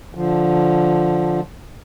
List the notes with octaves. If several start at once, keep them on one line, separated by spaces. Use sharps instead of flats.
D3 F3